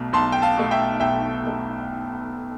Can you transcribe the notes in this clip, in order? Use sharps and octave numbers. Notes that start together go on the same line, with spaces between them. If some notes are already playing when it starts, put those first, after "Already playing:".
Already playing: B1 B2 A3
B1 A5 C6
G5
F5 A5
B2 A3
E5 G5
B1 E5 G5
B2 A3